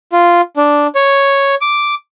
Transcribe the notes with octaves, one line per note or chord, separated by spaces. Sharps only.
F4
D4
C#5
D6